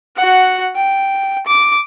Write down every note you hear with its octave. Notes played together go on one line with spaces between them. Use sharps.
F#4 F#5
G5
D6